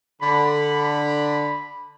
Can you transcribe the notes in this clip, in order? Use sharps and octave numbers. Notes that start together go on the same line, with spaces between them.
D3 B5